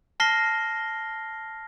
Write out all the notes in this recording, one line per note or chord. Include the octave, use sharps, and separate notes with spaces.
A5 F6 A#6 C7 G7